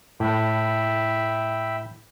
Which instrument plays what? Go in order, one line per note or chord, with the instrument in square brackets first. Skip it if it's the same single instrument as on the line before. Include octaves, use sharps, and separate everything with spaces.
[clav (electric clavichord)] A2 [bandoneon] E5 G5 B5